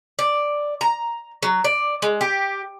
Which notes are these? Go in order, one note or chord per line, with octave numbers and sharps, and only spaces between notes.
D5
A#5
F#3
D5
G#3
G4